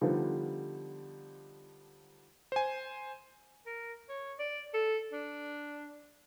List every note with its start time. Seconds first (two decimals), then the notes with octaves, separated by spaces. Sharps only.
0.01 D3 F3 G3 B3 D#4 F4
2.52 C5 G#5
3.66 A#4
4.09 C#5
4.39 D5
4.74 A4
5.12 D4